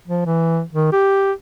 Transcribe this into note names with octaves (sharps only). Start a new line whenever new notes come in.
F3
E3
D#3
G4